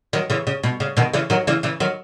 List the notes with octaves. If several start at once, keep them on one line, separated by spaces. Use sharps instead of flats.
D#3 F#3
C#3 E3
C#3
B2
C#3
B2 D#3
C#3 E3
D#3 F#3
C#3 E3
C#3 E3
D#3 F#3